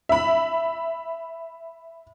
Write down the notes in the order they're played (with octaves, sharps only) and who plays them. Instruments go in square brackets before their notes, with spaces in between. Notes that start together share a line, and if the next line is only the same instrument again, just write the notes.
[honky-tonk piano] E5 B5